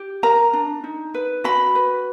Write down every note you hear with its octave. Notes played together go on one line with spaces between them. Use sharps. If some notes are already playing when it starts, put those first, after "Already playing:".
Already playing: G4
A#4 A#5
D4
D#4
B4
F#4 B5
B4